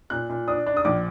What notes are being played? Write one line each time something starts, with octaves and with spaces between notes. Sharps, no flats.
A#2 F#6
A#2
D4 D#6
D4
D#6
A#1 D6